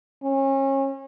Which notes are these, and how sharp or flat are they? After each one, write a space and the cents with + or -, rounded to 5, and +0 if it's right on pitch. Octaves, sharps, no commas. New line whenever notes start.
C#4 -30